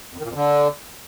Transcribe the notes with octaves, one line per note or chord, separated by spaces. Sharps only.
F2
D#3
A#2
F2
D3